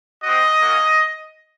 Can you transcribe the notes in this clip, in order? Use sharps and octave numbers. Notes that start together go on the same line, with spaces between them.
C4 F#4 D#5
A#3 C#4 F#4